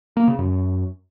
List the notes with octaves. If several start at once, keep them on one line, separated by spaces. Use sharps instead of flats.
A#3
C#3
F#2